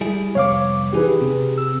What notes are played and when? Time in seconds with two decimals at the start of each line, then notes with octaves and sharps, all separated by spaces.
0.01 G3 E4 G#4
0.35 C2 F2 B3 C#5 F5 D6
0.93 E3 D#4 G4 G#4 B4
1.21 C3
1.58 E6